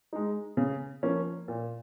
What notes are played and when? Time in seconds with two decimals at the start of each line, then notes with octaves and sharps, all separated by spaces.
0.13 G#3 D#4
0.57 C#3
1.03 F3 A#3 C#4
1.48 A#2